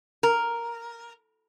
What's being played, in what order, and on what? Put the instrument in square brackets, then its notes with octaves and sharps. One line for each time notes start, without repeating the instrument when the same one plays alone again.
[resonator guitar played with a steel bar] A#4